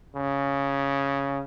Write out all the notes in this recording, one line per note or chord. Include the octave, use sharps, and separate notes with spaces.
C#3